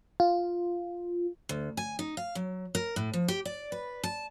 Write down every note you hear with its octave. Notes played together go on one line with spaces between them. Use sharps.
F4
D2
G#5
D#4
F5
F#3
A#4
A2
F3
G4
D5
B4
A5